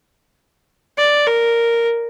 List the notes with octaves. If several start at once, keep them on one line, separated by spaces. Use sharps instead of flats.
D5
A#4